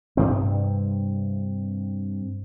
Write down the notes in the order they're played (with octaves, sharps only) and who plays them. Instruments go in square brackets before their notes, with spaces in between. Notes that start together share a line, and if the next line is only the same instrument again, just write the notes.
[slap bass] G2 C3 C4